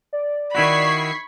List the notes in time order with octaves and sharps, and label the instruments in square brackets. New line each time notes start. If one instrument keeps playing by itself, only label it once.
[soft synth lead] D5
[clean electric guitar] D#3 E4 F#4 [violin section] B5 C7 [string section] C#6 G#6 B6